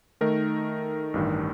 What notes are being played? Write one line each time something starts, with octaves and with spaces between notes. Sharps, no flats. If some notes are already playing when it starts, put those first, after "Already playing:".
D#3 A3 D#4 A#4
A1 G2 D#3